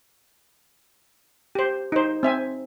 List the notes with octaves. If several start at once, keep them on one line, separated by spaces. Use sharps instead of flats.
G4 C5
D#4 C5
C4 E5 G#5